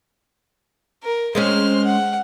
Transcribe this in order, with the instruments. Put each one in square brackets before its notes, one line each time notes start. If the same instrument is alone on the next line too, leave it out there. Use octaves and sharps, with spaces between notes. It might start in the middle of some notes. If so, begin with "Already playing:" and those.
[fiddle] A#4
[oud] G#3 C4 C#4 [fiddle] C5 F6
[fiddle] F#5